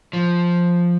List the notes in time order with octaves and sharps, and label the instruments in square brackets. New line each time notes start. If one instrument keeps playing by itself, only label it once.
[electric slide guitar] F3